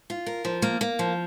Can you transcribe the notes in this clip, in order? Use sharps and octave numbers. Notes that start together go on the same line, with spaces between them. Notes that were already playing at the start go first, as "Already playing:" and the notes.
F4
A#4
F3
A#3
A#3
F3